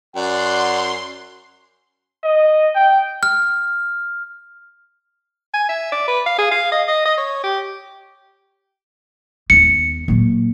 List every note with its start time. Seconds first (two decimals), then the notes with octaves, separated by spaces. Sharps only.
0.16 F#2 D5 F#5 C6
2.24 D#5
2.75 G5
3.23 F6
5.54 G#5
5.69 E5
5.92 D5
6.08 B4
6.26 F5
6.38 G#4
6.51 F5
6.72 D#5
6.88 D#5
7.05 D#5
7.18 C#5
7.44 G4
9.50 D#2 B3 C#7
10.08 A#2 F#3